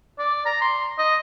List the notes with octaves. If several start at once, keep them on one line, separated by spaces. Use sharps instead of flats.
D5
A#5
C6
D#5